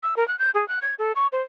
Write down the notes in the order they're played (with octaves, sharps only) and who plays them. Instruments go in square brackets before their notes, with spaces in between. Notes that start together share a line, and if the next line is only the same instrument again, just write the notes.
[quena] E6
A#4
F#6
G6
G#4
F#6
G#6
A4
C#6
C5